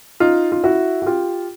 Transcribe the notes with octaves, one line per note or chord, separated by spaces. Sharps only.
D#4 F4
F4
E4 F#4
F#4
F4 G4